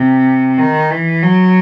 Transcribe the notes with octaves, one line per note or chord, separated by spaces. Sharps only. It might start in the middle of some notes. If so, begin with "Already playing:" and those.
Already playing: C3
D#3
E3
F#3